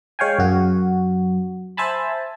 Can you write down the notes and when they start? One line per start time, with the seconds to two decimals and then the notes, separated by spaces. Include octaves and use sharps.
0.19 G#3 C#5 F5 G5 G#5
0.39 F#2 F#4
1.77 C5 E5 G#5 A5 B5